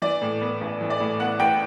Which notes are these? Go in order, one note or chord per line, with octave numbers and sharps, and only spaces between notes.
E3 D5
A2
B3
A1
E3
D5
A2
B3 F#5
A1 G5